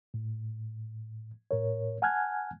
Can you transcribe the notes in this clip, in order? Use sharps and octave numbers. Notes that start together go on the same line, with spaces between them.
A2
A2 A#4 C#5
F#5 G#5 A5 F6 F#6 G#6